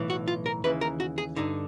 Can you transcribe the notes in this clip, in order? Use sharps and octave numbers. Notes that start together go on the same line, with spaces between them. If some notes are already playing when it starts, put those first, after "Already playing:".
Already playing: B1 A2 E3
F#4
F4
A#4
D#2 C#3 E3 B4
A#4
F#4
G#4
G2 D3 D#4